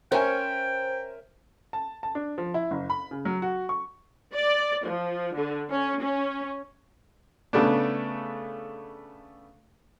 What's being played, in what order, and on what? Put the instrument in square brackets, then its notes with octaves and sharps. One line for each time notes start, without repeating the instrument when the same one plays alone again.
[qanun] C#4 [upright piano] A#4 E5 G#5 [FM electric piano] C5 [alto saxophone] G5
[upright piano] A5
A5
D4
F3
E4
F#1
B5
C#3
F#3
F#4
C#6
[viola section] D5
F3
D3
C#4
C#4
[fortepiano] C#3 A3 B3 D4